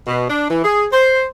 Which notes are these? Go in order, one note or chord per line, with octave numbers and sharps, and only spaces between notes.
B2
D4
E3
G#4
C5